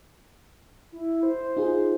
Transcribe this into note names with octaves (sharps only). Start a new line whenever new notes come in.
E4
C5
D#4 F4 G#4